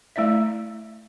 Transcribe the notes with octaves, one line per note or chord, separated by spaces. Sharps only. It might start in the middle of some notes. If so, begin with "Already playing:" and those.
A3 E4 D5 E5